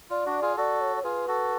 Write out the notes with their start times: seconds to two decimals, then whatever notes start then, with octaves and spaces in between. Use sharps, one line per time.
0.10 F4 D5
0.26 D4 F#4
0.42 F4 G#4
0.57 F#4 A4 D5
0.81 C#5
0.96 C#5
1.04 F4 G#4 B4
1.28 F#4 A4